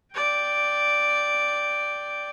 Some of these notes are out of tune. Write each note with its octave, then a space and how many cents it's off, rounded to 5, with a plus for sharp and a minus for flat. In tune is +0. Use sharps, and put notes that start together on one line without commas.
D5 +0 G5 +0